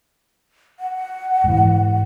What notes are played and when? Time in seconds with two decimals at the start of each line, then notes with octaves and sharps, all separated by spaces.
0.80 F#5
1.44 G#2 E3